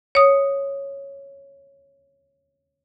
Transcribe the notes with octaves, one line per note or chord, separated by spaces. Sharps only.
C#5 D#6